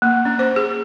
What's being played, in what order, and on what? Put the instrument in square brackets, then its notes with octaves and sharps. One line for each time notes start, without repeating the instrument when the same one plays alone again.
[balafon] A#3
C#4
C5
G#4